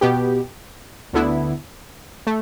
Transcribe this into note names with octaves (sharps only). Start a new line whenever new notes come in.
B2 B3 G4
D2 D3 B3 E4
A3